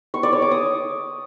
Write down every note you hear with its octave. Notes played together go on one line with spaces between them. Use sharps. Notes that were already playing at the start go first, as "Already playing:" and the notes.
C#6
D5
C#5
D6
D#6